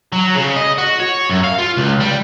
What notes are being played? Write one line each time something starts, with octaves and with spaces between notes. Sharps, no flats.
F#3
C#3
D#5
F#4
C#5
F#2
F5
F4
C#2
G3